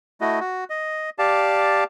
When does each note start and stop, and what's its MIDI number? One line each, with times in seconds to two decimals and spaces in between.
0.21 0.39 57
0.21 0.39 64
0.21 0.39 66
0.21 0.39 75
0.40 0.64 66
0.70 1.10 75
1.19 1.84 67
1.19 1.84 74
1.19 1.84 77
1.19 1.84 81